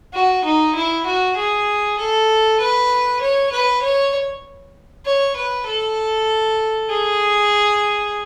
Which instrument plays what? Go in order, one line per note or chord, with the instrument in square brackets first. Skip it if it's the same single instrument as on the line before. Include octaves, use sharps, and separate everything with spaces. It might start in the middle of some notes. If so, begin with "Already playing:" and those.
[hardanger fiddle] F#4
D#4
E4
F#4
G#4
A4
B4
C#5
B4
C#5
C#5
B4
A4
G#4